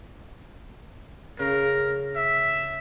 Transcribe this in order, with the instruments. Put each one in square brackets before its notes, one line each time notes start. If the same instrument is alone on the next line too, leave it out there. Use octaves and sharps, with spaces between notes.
[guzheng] C#3 [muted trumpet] A#4
[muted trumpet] E5